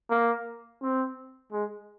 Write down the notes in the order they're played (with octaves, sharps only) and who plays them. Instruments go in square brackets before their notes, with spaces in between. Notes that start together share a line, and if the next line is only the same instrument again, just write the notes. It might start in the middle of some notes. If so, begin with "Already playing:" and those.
[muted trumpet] A#3
C4
G#3